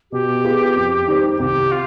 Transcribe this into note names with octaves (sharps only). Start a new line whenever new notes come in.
B2 G4
B3 F4 G#4
F2
D#3 G3 C4
C2 G4
F4